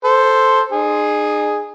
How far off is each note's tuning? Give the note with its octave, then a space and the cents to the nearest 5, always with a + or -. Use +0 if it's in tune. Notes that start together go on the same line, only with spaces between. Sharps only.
A4 +0 C5 +0
D#4 -45 G#4 +0